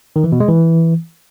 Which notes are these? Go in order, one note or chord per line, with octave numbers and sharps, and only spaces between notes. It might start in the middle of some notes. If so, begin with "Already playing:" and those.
D#3
E3
B2
G#3
E3